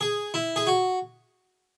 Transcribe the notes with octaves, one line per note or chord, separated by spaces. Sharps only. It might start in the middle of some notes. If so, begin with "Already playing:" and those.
G#4
E4
G#4
F#4